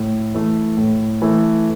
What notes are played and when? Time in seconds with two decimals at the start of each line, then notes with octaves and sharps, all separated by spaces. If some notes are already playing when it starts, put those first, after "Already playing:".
Already playing: A2
0.34 E3 A3
0.77 A2
1.22 E3 A3